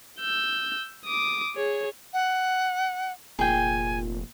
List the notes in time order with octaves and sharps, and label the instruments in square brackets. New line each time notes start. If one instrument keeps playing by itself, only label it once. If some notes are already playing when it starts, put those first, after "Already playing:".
[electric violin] E6 G6
D6 D#6
G#4 C#5
[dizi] F#5
[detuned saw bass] F1 [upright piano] A#2 [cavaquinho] G#4 G5 [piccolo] G#5